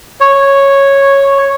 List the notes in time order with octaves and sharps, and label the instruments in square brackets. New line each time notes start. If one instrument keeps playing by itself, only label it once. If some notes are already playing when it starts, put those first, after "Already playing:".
[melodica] C#5